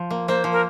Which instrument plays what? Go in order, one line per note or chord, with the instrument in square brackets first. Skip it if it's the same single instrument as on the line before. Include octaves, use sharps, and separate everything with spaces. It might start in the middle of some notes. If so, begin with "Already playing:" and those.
Already playing: [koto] F3
A#3
[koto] A#3 [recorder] C5
[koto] F3
[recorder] A#4